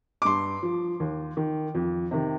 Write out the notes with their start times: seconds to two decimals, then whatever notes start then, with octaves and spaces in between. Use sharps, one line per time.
0.22 D6
0.25 G2 C6
0.63 F3
1.00 D#2
1.37 D#3
1.75 F2
2.11 C3 D#3